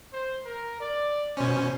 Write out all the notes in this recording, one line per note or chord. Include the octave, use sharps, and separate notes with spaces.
C5
A#4
D5
B2 C#4 C5